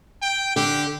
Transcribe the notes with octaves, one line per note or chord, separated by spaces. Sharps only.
G5
D3 G4